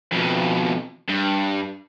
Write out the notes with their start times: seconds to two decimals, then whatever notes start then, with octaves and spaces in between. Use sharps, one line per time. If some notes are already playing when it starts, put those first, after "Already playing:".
0.13 F2 B2
1.09 G2